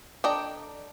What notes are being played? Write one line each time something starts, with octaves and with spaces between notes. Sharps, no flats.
D4 A4 D#5 G5 A#5